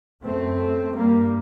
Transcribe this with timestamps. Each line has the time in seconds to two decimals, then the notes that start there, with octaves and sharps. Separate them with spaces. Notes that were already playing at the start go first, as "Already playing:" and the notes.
0.24 F#2 A3 C4
0.94 G2 G3 A#3